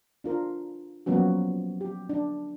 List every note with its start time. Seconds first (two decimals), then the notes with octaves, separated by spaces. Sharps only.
0.24 D4 F4 A#4
1.06 F3 F#3 A#3 B3 C#4 F#4
1.81 G4
2.09 D4